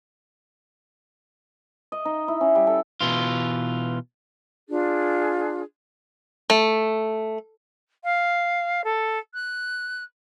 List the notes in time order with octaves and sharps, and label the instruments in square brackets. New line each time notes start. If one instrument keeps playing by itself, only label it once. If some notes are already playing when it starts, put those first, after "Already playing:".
[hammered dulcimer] D#5
D#4
E4
C#4
G3
A4
[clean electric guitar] B2 E3 F4
[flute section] D4 F4 G#4
[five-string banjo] A3
[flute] F5
A4
F#6